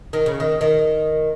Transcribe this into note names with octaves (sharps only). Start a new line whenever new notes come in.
D#3
C#3
D#3
D#3